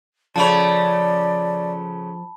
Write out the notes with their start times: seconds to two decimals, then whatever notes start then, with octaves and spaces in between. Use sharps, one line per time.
0.36 C#3 F3 A3 C#5 D5 A5 B5